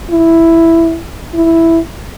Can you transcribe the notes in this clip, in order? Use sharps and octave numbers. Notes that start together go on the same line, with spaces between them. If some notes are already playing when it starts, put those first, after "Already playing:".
E4
E4